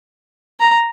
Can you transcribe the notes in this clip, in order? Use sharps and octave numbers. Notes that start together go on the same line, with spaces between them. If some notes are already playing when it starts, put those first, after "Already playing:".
A#5